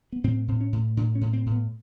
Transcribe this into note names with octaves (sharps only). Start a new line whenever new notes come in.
B3
A2 C4
A2 C4
C#4
A2
A2 D4
C#4
A2
C4
A2
B3